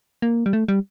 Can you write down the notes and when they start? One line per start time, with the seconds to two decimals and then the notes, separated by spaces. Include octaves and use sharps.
0.22 A#3
0.46 G3
0.53 A3
0.68 G3